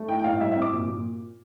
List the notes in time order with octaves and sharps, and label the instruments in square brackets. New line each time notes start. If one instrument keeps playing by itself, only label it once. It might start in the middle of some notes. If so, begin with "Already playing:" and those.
Already playing: [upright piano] A3
E4 G5
G5
A2 F5
G3 E5
E5
C4
D6
A#2
A#2